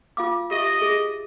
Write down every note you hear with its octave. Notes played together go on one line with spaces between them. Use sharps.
F4 F5 D6
G4 D#5 E5
G#4